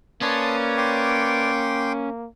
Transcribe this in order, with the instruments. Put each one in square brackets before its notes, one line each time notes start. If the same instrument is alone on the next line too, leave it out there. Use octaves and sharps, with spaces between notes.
[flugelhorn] A#3 [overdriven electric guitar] C#4 [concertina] B4 C#5 D5 [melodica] A5 C6 D#6
[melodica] G5 C6 D6